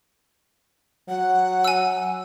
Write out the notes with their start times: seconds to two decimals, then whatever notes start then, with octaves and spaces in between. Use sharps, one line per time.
1.09 F#3 F#5
1.64 G#5 E6